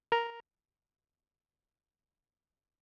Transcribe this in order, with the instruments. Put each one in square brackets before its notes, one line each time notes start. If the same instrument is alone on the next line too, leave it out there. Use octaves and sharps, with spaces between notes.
[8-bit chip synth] A#4 A#5